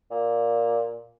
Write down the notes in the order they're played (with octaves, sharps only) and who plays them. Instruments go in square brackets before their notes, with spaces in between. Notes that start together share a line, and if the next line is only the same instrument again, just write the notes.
[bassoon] A#2